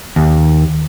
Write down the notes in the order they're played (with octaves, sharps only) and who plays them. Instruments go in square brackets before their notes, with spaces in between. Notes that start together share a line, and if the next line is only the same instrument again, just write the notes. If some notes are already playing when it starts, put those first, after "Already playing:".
[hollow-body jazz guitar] D#2